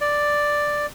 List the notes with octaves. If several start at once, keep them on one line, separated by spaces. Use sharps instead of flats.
D5